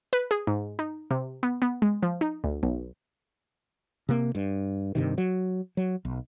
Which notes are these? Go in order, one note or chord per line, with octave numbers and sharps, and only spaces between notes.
B4
G#4
G#2
D#4
C3
B3
B3
G#3
F3
D#4
D2
B1
C3 A#3
G2
G2 C3 D#3
F#3
F#3
B1